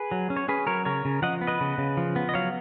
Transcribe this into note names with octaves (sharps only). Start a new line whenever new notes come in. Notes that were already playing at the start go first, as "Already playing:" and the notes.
Already playing: G#4 B4
F#3
C#4
C#5
C#4 G#4 B4
F#3 A#4 C#5
C#3 A#4 C#5
C#3
F3 D#5 F#5
B3
B4 D#5
C#3
C#3
F3
B3
D#5
F#3 C#5 F5